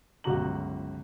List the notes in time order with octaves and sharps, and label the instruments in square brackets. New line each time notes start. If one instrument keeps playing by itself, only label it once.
[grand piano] G1 C#2 F#3 F#4 A#5 F#7